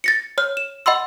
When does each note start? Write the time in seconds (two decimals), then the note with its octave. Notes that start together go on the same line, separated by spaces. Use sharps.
0.04 A6 A#6 C#7
0.38 C#5 F6
0.57 E7
0.86 D#5 F#5 B5 C6 E6